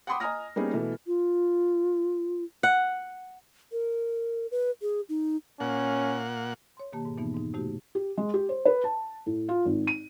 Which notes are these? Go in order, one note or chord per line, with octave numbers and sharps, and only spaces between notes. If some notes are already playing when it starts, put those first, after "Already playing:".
F#5 G5 B5 C6 D6 D#6
D#5 G#5 A#5 D#6 F6 A#6
G3 A#3 B3 C#4 D#4 G#4
B2 E3 A3
F4
F#5
A#4
B4
G#4
D#4
A#2 C#4 F#5
C#5 C6
B2 D#3 A#3 G4 A5
G#2
F2 B2 E3 A#3 B3 D#4
G#2 D#4
C3 A3 D#4 F#4 G4
G4
G#3
G4
C5
B4
A5
A2
F4
G#1
D#7